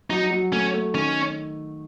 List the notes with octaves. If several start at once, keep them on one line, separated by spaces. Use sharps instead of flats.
F#3 D#4
F#3
A3 C#4
A3
D#3 C#4